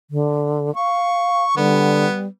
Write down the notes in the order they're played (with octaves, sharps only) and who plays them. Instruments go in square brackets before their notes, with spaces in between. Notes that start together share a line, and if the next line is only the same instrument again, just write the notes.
[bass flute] D3
[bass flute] F5 [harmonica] C#6
[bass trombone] D3 [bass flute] G3 [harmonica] B3